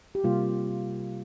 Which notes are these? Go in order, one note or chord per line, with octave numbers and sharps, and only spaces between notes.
G4
C3 G3 A#3 F4